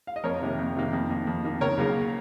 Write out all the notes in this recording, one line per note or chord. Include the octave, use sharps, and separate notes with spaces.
F5
D#5
F2 A#4 C#5
C3 D#3 A#3
F2
C3 D#3 A#3
F2
D#3 A#3
F2
D#3 A#3
C#2 A#4 C#5
C#3 F#3 A#3